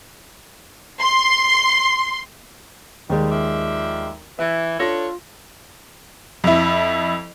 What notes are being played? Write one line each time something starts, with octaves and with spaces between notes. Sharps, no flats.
C6
D#2 G3 G#3
F3 D5 E5
E3 E5
D4 F4 A4 C#5 A#6
F2 E4